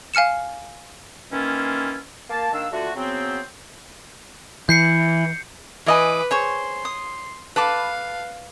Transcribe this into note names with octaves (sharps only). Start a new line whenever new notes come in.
F5 G#5 F6 C#7 E7
D#3 E3 A#3 C#4 E4 F4
A#3 A5
D#3 A#3 D4 F5 E6
D3 A3 F4 F#4
C#3 F#3 B3 C4
E3 G6 C7 C#7
E3 B4 D#5 G#5 D6
G#4 C5 C#5 C6 C#6
D#6
A4 B4 F5 A5 D6